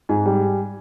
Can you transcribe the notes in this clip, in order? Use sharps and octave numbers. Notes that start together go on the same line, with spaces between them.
G#2 G#5
G3